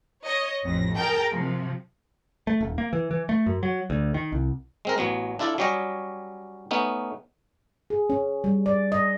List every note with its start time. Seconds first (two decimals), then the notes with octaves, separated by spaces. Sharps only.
0.23 C#5 D#5
0.64 A1 F2 A#6
0.95 G#4 A#4 G5 A5
1.30 C3 F3
2.47 A3
2.61 D#1
2.78 A#3
2.93 E3
3.11 E3
3.29 A3
3.46 F#2
3.63 F#3
3.90 D2
4.14 D#3
4.32 C2
4.85 G#3 C4 A#4
4.98 A1 F#3 B3
5.39 D4 E4 F4 A4 D5
5.58 F#3 G3 C#4 G4 D#5
6.71 A3 B3 C#4 D#4
7.90 G#4
8.10 C#4
8.44 G3
8.66 D5
8.92 D#5